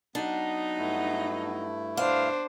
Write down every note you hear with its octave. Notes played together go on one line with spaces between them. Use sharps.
F#3 B3 D4 D#4
G2 A3 E4
D4 C5 F5